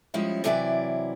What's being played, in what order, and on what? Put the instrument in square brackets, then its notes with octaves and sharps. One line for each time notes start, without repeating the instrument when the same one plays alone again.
[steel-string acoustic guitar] F3 G3 G#3 C#4 E4
C3 E3 F#3 E4 G#4 D5